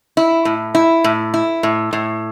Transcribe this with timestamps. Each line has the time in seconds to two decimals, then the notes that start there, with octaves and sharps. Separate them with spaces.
0.17 E4
0.45 A2
0.75 E4
1.04 A2
1.34 E4
1.63 A2
1.93 A2